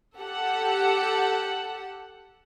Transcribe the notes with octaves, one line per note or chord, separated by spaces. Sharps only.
G4 A4 F#5